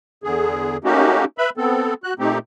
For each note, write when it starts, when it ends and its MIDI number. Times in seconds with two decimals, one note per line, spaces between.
0.24 0.77 40
0.24 0.77 50
0.24 0.77 68
0.84 1.25 57
0.84 1.25 58
0.84 1.25 61
0.84 1.25 63
0.84 1.25 66
0.84 1.25 67
1.38 1.50 71
1.38 1.50 76
1.38 1.50 83
1.57 1.94 59
1.57 1.94 60
1.57 1.94 69
2.04 2.14 66
2.04 2.14 90
2.19 2.38 46
2.19 2.38 57
2.19 2.38 60
2.19 2.38 63
2.19 2.38 67